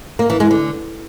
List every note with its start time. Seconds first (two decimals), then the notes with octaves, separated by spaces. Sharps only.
0.19 A#3
0.30 E3
0.40 G#3
0.51 D3